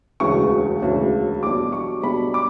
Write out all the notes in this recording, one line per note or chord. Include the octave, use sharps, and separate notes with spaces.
E1 D2 C#3 E3 C#6
E1 D2 C#3 E3
B1 B2 G3 D4 D6
C#6
B1 B2 G3 D4 B5
D6